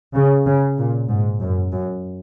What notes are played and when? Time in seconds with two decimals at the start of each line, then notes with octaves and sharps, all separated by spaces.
0.15 C#3
0.46 C#3
0.77 A#2
1.09 G#2
1.41 F#2
1.72 F#2